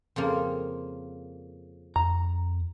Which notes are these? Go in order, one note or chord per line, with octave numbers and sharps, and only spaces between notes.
F2 C#3 A#3
F2 A#5